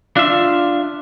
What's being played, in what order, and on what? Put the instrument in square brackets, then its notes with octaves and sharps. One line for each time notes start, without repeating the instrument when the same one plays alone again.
[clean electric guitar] D4 E5 [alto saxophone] F4